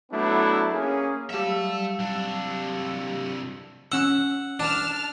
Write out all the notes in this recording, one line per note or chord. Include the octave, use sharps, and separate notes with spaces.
F#3 A3 B3 D4 E4
A#3 C#4 G#4
F#3 G3 E5 F5 A5 E6
C2 D4
C#4 F#5 E6
D4 A5 F6